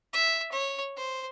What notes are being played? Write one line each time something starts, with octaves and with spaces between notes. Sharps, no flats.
E5
C#5
C5